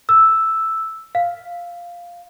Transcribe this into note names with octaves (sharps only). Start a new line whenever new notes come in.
E6
F5